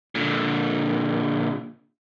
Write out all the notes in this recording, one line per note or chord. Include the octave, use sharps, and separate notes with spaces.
A#2 D3